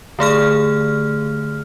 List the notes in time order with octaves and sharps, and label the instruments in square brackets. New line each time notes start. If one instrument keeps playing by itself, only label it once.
[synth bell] D3 A3 G#4 F6